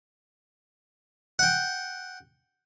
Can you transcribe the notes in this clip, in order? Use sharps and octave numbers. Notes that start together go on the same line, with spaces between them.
F#5 G5